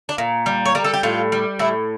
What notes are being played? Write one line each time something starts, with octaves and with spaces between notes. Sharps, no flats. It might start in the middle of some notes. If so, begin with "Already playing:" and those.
D4
A#2
G3
C#5
G3 A#4
A4
G4
A2 F4
G3
A2 E4